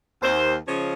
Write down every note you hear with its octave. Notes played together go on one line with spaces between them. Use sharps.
D#2 C5
C#3 F3 G#3 C#4 C#5